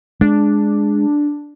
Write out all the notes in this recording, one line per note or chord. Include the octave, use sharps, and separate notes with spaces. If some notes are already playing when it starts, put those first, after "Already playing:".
G#3 D4